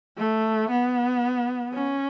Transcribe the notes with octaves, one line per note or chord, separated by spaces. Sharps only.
A3
B3
C#4